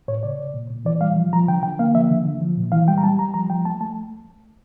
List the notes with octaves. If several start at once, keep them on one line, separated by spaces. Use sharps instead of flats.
A2 C#5
C#3 D5
C#3
A#2
A#2
E3 D5
G3 F5
F3
F3 A#5
D3 G5
D3 G5
A#3 F5
F3 E5
D3
D3
F3
A#2
E3 F5
G3 G5
A#5
G3 A5
G3 A#5
F3 A#5
F3 G5
A3 A5
A3 A5